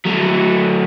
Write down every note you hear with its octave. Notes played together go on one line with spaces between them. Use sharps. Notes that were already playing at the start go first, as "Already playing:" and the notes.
F#3 A3